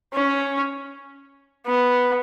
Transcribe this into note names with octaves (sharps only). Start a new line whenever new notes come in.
C#4
B3